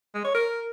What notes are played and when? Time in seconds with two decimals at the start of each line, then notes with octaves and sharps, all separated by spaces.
0.14 G#3
0.24 C#5
0.34 A#4